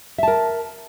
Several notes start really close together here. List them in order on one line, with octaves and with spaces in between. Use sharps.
E5 A5 A#4